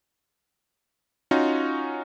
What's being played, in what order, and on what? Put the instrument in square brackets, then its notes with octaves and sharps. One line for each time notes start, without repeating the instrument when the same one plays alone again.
[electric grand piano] C#4 D#4 F4 F#4